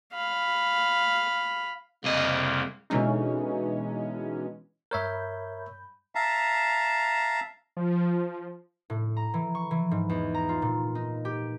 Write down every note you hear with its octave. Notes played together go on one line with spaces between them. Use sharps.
F5 B5
C2 F2 C#3 A#3 D#5
B2 D3 E3 G#3 C#4 D#4
G2 A#4 C#5 E5 B5 G6
E5 F5 A5 A#5
F3
A2
A#5
E3
C#6
E3
G#2
E2
A#5
F4
A#2
D#4
G4